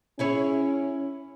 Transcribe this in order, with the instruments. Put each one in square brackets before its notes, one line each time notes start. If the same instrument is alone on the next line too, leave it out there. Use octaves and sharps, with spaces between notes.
[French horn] C#4 [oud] E4 G#4 C#5